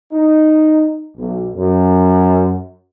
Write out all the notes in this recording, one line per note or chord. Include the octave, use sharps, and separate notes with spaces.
D#4
B1
F#2